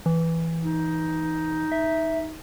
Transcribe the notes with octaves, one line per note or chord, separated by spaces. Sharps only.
E3
D#4
E5